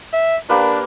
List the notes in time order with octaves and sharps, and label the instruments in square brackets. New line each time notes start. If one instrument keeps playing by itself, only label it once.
[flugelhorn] E5
[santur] A#3 G4 B4 [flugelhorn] D4